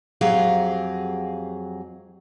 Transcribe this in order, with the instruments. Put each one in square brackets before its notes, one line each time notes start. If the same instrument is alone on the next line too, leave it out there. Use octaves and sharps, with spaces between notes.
[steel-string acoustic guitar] F2 F#3 G4 G#4 F5